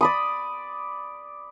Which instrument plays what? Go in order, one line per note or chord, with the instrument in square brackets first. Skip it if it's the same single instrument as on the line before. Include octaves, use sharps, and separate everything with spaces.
[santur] D5 B5 D#6